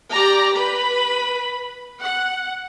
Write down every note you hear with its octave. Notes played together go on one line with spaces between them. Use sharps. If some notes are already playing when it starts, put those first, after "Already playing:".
G4 D5 A#5
B4 B5
F#5